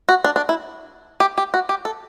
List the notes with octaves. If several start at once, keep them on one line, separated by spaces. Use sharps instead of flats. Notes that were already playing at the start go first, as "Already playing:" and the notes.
F#4
D4
D4
E4
G4
G4
F#4
G4
A4